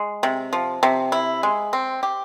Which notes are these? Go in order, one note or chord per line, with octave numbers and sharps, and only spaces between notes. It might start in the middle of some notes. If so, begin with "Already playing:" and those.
Already playing: G#3
C3
F3
C3
E4
G#3
C4
G4